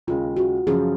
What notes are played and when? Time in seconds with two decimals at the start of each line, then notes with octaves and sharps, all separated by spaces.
0.07 D#2 C#3 G#3 F4
0.36 F#4
0.67 F#2 C#3 F3 G#4